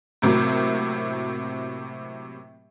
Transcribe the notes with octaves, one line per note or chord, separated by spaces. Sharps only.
A2 C3 F#3 A#3